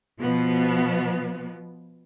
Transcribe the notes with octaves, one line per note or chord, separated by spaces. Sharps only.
B2 F3 B3